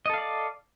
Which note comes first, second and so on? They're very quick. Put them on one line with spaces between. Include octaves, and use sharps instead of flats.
D#5 A4 F5 D5